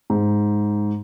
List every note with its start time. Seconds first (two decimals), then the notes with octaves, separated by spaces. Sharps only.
0.10 G#2